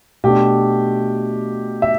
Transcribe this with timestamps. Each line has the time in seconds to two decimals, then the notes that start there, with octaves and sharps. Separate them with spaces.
0.24 B2 A3 D4 G4
1.82 E5